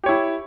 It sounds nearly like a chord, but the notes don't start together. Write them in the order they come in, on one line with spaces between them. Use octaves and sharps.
G4 C#5 E4